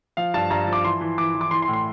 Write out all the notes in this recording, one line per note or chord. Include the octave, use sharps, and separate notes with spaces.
F3 F5
G2 A5
G2 A#5
F3
D6
E3 C6
E3
E3 D6
E3
D6
E3 C6
C6
A2
C6